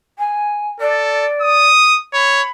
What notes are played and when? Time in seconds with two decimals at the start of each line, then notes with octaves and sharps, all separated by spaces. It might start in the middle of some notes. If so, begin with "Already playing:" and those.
0.18 G#5
0.80 A4 D5
1.41 D#6
2.14 C#5 B5